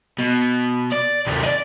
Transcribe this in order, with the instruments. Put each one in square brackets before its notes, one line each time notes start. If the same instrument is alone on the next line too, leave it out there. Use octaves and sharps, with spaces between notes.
[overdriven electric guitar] B2
D5
D#2 C3
D5 D#5